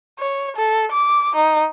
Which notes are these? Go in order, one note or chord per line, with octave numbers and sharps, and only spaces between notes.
C#5
A4
D6
D#4